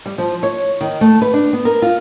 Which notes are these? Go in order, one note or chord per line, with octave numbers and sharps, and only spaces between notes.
G3
F3
C#5
D#3
A3
B4
D4
B3
A#4
F4